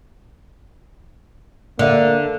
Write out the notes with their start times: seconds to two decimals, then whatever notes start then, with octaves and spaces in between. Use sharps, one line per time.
1.79 D3 A#3 D5 E5